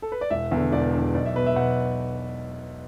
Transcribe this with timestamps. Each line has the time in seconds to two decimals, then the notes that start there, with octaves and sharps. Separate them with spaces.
0.02 A4
0.12 B4
0.21 D5
0.30 E1 E5
0.51 E2 D3
0.72 E1 D5
0.93 E2 D3
1.14 B1 D5
1.26 E5
1.36 B2 B4
1.46 E5
1.56 B1 F#5